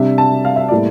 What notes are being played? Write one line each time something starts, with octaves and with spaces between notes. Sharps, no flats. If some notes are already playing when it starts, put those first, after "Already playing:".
Already playing: C3 G3 D4 E5
A5
F5
E5
A2 G3 A#3 E4 D5